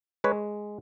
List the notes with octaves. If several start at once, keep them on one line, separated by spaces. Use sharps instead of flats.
G#3 B4 C#5